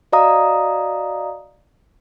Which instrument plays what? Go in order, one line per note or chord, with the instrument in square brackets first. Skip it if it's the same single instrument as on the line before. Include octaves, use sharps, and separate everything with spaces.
[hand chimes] F#4 D5 D#5 F5 A#5 D#6